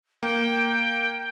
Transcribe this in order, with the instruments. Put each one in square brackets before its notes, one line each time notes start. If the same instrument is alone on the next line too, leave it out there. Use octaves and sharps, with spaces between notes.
[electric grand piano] A#3 [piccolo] G5